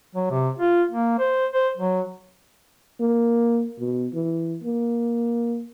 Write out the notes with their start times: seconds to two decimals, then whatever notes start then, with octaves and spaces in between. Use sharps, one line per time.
0.15 F#3
0.31 C3
0.59 F4
0.91 A#3
1.19 C5
1.51 C5
1.77 F#3
3.00 A#3
3.79 B2
4.14 E3
4.64 A#3